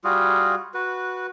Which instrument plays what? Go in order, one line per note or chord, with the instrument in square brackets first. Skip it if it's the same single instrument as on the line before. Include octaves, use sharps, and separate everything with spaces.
[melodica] G3 F4 F#4 G#4
F#4 B4